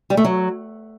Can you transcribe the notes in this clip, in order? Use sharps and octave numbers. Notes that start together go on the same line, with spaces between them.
G3
A3
F#3